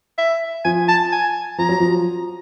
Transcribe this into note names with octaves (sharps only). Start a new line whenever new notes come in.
E5
F3 G#5
A5
G#5
F3 A#5
F#3
F3